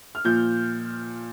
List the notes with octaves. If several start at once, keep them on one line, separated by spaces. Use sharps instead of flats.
F6
A#2 F3 G6